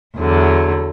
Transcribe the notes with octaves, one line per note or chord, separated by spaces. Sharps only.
E2 D3 F#3